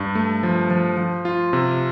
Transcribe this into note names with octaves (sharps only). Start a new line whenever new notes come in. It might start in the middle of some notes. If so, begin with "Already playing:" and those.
Already playing: G2
A3
F3
F3
F3
F4
C3